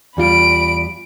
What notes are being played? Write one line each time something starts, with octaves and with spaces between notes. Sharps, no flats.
E2 G3 F4 B5 D7